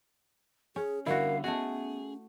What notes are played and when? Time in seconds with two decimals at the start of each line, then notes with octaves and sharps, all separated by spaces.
0.76 C#4 G#4
1.06 D3 G3 E4 F#4 A#4 F5
1.44 A3 B3 C#4 F#4 G#4